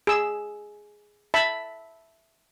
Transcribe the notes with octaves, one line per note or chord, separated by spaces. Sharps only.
G#4 E6
E5 A5 B5